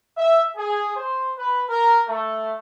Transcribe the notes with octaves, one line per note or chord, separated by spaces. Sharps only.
E5
G#4
C5
B4
A#4
A3